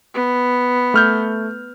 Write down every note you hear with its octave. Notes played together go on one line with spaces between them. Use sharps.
B3
A3 F6 G6